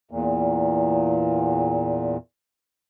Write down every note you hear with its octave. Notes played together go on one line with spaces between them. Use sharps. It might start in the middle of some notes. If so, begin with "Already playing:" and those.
E2 A#2